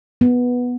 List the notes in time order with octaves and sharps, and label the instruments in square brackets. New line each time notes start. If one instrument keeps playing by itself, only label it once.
[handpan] B3